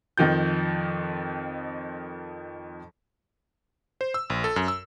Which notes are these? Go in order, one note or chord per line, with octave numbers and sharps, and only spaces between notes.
F2 D#3 F3 G6
C5
E6
A#1
A4
F#2
E6